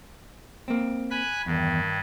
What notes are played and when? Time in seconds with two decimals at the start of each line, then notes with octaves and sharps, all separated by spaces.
0.68 A#3 C4
1.11 G#5 B5 F#6
1.46 E2 G2 D#3